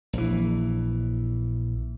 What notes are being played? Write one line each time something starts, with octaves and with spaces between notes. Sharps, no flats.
A#1 E3